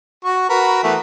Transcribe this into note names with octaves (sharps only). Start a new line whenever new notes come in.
F#4 C#6
F#4 A#4 B4
E3 A3 B3